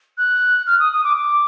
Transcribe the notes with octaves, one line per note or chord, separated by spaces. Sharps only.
F#6
F6
D#6
D#6
D6
D6